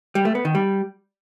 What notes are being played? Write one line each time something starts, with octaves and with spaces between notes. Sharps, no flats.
G3
A3
B3
D#3
G3